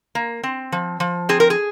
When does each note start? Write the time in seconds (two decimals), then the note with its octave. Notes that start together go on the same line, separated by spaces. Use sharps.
0.15 A#3
0.43 C4
0.72 F3
1.00 F3
1.29 C4 G#4
1.40 A#4
1.50 G#4